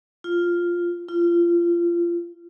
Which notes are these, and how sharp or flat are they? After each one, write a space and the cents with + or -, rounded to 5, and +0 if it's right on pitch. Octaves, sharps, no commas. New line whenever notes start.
F4 +0
F4 -25